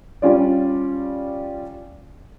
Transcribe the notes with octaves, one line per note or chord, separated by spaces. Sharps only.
G3 C#4 F4 D5